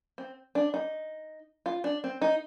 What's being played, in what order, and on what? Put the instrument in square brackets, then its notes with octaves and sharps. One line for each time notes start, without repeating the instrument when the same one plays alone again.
[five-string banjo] C4
D4
D#4
F4
D4
C4
D#4